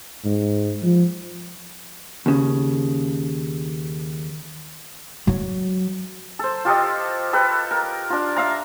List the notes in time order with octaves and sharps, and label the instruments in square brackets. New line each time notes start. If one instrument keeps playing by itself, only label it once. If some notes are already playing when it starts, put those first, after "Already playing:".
[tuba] G#2
F3
[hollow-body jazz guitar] D#2 C#3
[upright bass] F#3
[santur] A4 C5
F4 G4 A4 D#5
A4 B4 G5
A#4
D4 F4
E5 F5 A#5